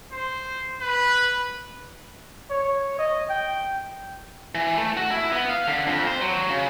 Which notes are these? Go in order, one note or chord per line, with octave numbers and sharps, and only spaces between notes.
C5
B4
C#5
D#5
G5
E3
A3
F#4
E4
B3
F5
D3
F2
C5
F#3
C#3